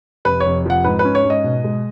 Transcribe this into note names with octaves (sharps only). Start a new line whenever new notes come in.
F1 B4
C#5
F1
F3 F#5
G#2 B4
B4
C#4
C#5
G#2
D#5
B2
G#3